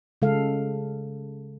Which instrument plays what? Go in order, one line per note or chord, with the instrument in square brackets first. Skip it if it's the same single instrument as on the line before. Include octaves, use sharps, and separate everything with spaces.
[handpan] C#3 G#3 A4 F5